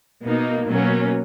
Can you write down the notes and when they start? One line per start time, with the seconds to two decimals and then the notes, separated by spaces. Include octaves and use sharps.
0.23 B2 A#3 D#4
0.70 B2 F#3 A#3 C#4